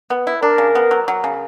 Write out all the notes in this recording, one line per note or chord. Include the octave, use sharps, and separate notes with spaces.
B3
E4
D4 A#4
C#3
B3
F#3
F#3
C#3